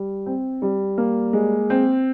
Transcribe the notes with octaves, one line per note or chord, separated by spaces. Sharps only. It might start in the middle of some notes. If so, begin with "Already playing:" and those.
Already playing: G3
C4
G3
A#3
G#3
C4